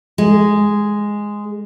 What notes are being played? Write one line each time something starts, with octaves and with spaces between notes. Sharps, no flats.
G#3